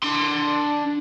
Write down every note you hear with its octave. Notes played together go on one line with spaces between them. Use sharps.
D4 C6